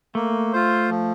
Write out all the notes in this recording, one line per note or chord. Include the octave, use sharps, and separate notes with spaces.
A3 A#3
F4 C5
F3